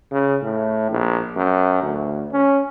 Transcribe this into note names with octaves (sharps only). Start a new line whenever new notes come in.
C#3
A2
A#1
F#2
D2
C#4